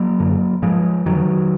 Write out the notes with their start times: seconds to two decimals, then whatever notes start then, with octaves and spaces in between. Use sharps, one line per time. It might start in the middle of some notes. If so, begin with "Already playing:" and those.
Already playing: F#3 A#3
0.20 F#2 D3
0.62 G#2 F3 G#3
1.06 F2 D3 D#3 F#3